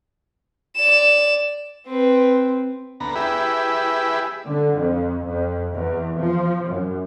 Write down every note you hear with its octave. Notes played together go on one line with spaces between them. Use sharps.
D5 E7
C4 B4
D2 B3 A#5
E4 G4 G#4 B4 E5
D3
F2
F2
E2
F3
F#2